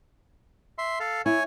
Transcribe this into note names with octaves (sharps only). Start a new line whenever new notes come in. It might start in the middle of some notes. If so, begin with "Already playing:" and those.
E5 C6
A4 F5
E4 C#5 G#5